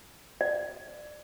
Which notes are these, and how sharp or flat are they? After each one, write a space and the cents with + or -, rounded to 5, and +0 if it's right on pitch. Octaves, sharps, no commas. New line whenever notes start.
D5 +25